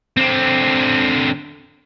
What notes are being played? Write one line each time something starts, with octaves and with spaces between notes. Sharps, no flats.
D3 C4